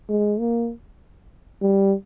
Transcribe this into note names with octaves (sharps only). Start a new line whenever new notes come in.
G#3
A#3
G3